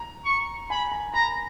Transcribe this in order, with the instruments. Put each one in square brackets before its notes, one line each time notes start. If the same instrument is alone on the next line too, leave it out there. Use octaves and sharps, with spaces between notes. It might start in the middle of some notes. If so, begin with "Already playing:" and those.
Already playing: [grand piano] A#5
[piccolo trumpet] C#6
[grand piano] G#5 [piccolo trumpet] B5
[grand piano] A#5
[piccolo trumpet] A#5 [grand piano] B5